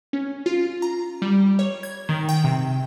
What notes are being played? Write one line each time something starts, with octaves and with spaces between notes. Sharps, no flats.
C#4
F4
A#5
G3
C#5
G#6
D#3
G5
C3